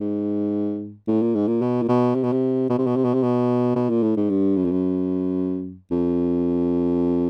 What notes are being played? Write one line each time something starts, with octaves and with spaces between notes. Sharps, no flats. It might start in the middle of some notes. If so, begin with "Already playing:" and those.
G#2
A2
A#2
G#2
A#2
B2
A#2
B2
C3
B2
C3
B2
C3
B2
C3
B2
C3
B2
B2
A#2
A2
G#2
G2
F#2
F2
F#2
F2